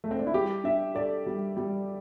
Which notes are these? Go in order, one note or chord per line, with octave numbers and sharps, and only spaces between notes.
A3
C4
D4
E4
G3 G4
D4 E5
A4 D5
G3
G3